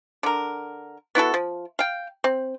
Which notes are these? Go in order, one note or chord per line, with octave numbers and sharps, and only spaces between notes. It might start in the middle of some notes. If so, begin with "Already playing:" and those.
D3 A#4
B3 E4 F#4 A4
F3
F5 G5
C4